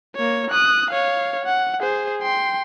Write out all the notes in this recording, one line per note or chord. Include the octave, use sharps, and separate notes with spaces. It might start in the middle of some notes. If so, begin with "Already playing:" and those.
A#3 C#5
D#6 F#6
C#5 F5
F#5
G#4 C5
G5 C6